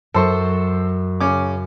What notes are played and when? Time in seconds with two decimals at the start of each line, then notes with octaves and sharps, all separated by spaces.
0.14 F#2 A4 C5 C#6
1.20 C#3 C#4 D6